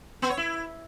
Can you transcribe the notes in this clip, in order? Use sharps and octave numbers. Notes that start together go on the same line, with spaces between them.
B3
C#5
E4